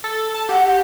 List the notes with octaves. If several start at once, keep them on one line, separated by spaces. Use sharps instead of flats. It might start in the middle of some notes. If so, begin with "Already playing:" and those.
A4
A5
G4 F#5